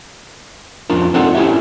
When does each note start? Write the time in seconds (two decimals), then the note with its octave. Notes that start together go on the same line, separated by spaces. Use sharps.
0.90 F2 C#4 D4 F4 A#4
1.14 C4 D4 D#4 F4 A4 F#5
1.35 C#4 E4 G4 C#5 E5